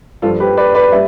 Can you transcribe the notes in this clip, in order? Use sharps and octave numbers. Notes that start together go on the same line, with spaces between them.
G2 F3 F4 A4
G4 B4
B4 D5
B4 D5
G3 E5